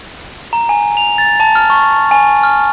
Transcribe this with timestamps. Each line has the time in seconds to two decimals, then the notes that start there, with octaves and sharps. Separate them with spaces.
0.53 A#5
0.69 G#5
0.97 F7
1.18 A6
1.40 A5
1.55 F6
1.70 C#6
2.11 G#5
2.43 F6